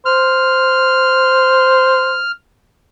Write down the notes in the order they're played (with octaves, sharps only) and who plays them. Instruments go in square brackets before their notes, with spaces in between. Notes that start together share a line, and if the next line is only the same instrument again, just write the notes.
[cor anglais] C5 [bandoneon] F6